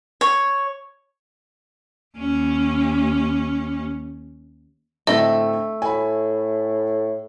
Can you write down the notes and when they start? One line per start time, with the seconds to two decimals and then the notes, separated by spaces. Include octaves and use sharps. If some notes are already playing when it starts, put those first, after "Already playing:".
0.21 C#5
2.17 D#2 C#4
5.07 A2 D3 A3 C4 D#5
5.82 A2 G#5 B5